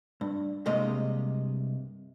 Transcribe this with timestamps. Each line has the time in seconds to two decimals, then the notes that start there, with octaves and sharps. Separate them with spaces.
0.21 G2
0.66 C2 G2 C3 G#3 A#3 D#5